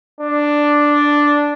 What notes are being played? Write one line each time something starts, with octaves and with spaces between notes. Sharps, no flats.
D4